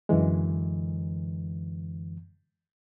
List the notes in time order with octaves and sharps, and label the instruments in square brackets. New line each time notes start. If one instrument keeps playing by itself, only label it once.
[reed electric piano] F#2 D3 E3 G#3